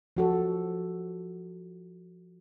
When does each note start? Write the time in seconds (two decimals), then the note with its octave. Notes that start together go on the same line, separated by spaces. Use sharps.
0.17 F3 F#4 A4